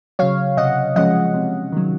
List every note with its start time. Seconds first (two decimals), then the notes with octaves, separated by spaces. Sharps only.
0.19 C#3 F#3 C#5 F5
0.57 C3 D#5 F#5
0.96 F3 G#3 C#4 D#5 F#5
1.34 C3
1.72 D#3 F#3